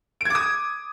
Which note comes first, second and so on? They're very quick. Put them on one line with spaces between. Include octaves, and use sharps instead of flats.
D7 G#6 D6 D#6